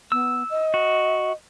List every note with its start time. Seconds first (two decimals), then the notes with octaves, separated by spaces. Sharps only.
0.12 B3 E6
0.50 D#5
0.74 F#4